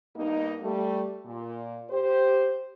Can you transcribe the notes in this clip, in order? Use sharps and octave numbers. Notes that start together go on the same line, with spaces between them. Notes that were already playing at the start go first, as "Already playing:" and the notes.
G2 A#3 B3 D#4
G3 A3
A#2
G4 C5